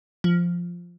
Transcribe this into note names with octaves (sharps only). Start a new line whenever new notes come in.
F3